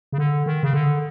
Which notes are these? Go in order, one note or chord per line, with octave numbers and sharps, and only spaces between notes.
C#3
D3
D#3
C#3
D3